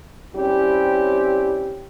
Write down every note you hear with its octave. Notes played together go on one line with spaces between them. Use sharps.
G3 C4 C#4 E4 G4